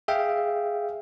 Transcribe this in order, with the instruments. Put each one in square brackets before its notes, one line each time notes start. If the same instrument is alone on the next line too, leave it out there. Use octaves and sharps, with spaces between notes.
[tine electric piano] G#4 E5 F5 G5